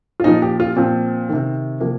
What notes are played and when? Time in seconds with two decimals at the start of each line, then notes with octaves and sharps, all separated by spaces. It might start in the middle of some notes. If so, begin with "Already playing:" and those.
0.20 F4
0.24 A#2 F3 D#4
0.42 G4
0.60 F4
0.76 A#2 F3 C4
1.29 C3 D#3
1.80 C3 F3 A#3